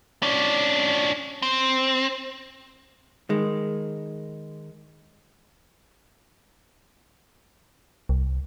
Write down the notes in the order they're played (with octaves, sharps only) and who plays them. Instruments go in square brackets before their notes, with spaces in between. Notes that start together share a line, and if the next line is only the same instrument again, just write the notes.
[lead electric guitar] C#4 D4
C4
[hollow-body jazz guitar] D#3 G#3
[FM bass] C2